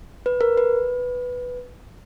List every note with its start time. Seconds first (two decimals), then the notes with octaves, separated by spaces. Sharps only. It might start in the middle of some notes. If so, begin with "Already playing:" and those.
0.26 B4
0.41 A#4
0.58 B4